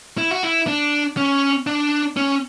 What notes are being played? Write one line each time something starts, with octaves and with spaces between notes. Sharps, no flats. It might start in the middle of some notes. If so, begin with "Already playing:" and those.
E4
F#4
E4
D4
C#4
D4
C#4